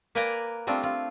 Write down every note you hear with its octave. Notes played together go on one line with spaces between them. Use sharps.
A#3 B4 D5 G5 G#5 A#5
G3 A3 C4 D4 F4
F4